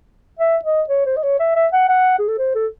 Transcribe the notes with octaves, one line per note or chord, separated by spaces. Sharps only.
E5
D#5
C#5
C5
D#5
C#5
E5
E5
F#5
F#5
G#4
A4
C5
A4